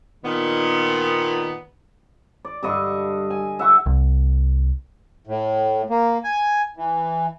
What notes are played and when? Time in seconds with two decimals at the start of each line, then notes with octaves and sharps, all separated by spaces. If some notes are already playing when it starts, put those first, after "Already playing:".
0.24 A#2 D#3 B3
2.45 D5
2.63 G2 D3 D#5 C#6
3.30 G#5
3.59 E5 F#5 C#6
3.86 C2
5.27 A2
5.90 A#3
6.24 G#5
6.77 E3